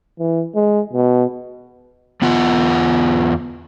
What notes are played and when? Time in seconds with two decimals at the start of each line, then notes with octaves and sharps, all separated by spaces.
0.19 E3
0.55 G#3
0.93 B2
2.22 E2 B3 F4 F#5